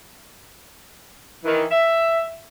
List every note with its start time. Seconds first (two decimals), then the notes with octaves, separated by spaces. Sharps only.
1.45 D#3 E3
1.72 E5